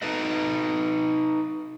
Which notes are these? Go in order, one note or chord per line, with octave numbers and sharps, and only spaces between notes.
D#4 A4 B4 D#5